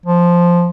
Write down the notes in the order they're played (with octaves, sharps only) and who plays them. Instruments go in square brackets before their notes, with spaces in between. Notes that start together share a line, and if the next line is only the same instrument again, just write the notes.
[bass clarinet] F3